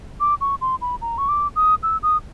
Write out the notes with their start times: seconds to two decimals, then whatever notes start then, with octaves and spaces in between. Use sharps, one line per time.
0.20 D6
0.41 C#6
0.61 C6
0.81 B5
1.01 A#5
1.18 C#6
1.29 D6
1.56 D#6
1.83 E6
2.03 D#6